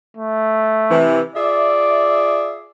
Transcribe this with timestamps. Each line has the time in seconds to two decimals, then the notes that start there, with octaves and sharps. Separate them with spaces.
0.17 A3
0.90 C3 E3
1.36 F4 G#4 D5 E5